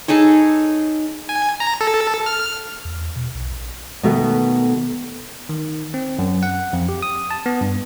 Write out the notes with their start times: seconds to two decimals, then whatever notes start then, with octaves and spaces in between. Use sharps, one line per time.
0.08 D#4 G#4 A4 C#5
1.29 G#5
1.60 A#5
1.81 A4
2.26 F6
2.85 E2
3.16 B2
3.34 B1
3.52 A#1
4.03 B2 D#3 A3 B3
5.49 D#3
5.94 C4
6.19 F#2
6.43 F#5
6.73 F2
6.89 G4
7.02 D#6
7.31 A5
7.46 B3
7.61 G2